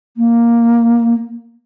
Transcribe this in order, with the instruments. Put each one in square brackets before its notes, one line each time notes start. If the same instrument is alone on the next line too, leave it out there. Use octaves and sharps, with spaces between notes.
[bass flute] A#3